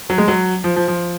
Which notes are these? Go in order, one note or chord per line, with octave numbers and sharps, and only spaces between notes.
F#3
G#3
F#3
F3
F3
F3